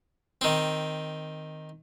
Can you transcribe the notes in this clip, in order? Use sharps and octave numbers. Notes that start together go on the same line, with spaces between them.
D#3 C4